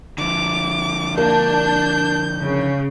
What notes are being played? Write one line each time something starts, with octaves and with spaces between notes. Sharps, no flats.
D3 F3 D6
A#3 D4 G6
C#3